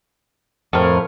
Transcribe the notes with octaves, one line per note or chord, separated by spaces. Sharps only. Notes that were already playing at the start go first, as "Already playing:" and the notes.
F2 A2 A#4